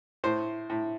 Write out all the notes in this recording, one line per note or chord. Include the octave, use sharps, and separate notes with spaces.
A2 C5
A2